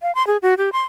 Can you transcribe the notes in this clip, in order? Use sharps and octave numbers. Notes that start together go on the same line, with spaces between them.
F5
C6
G#4
F#4
G4
C6